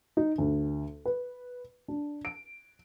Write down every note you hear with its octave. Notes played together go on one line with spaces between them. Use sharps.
D#4
D2
B4
D4
D7